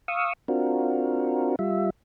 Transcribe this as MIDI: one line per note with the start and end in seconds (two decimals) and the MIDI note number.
0.08 0.33 77
0.08 0.33 85
0.08 0.33 87
0.08 0.33 88
0.48 1.56 60
0.48 1.56 62
0.48 1.56 65
0.48 1.56 66
0.48 1.56 70
1.59 1.90 55
1.59 1.90 65
1.59 1.90 76